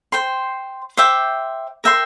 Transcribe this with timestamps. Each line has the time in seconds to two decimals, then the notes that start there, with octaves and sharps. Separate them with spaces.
0.12 C5 G5 C6
0.97 C5 E5 G5 D6
1.84 A#4 E5 G5 C6